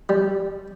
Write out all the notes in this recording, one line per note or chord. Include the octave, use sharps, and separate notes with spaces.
G3